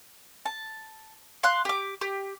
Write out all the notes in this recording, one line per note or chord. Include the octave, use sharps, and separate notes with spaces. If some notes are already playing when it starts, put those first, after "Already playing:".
A5
F5 C6 F#6
G4 D6
G4